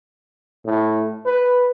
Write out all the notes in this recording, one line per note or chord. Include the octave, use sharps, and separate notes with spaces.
A2
B4